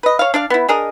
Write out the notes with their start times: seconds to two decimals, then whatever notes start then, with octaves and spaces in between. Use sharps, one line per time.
0.03 B4 D#5
0.19 C#5 F5
0.34 D4 D5 F5
0.50 B3 E4
0.69 D4 G#4 A#4 D#5